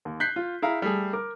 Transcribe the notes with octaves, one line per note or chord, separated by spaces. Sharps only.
D#2
F#6 G6 B6 C7
F4
E4 G#4 F5 A#5
G3 A3 G#4
A#4 D6